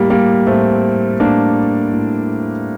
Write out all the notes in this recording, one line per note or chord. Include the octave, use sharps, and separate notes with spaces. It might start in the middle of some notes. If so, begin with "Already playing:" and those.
Already playing: A2 G3 A#3
G3 A#3
A2 A3 C4
A2 A#3 D4
A2